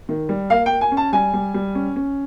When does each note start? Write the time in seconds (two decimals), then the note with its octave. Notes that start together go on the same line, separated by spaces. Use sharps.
0.09 D#3
0.29 G3
0.50 A#3 F5
0.66 A#3 G5
0.81 G#5
0.92 C#4
0.97 A5
1.13 G3 G#5
1.33 G3
1.54 G3
1.75 C#4
1.96 C#4